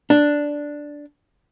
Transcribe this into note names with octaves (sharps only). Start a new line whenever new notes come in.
D4